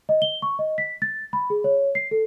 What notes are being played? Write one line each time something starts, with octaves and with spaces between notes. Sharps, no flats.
D#5
G7
C#6
D#5
B6
A6
B5
G#4
C#5
C7
A4